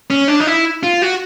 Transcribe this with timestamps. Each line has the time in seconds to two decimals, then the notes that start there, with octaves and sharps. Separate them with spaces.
0.10 C#4
0.28 D4
0.40 D#4
0.47 E4
0.83 F4
1.02 F#4